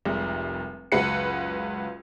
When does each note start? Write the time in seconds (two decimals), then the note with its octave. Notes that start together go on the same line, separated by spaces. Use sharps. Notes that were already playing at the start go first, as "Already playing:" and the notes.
0.05 F1 C2 G3 G#3
0.92 F#1 C#2 F#4 B4 C#7